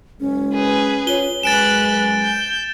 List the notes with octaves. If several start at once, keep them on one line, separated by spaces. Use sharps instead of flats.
F#1 G#3 C#4
G#4 B4
F4 C#5 G7
F#2 G#3 B4 G#5 F#6 A6 D7 E7
G6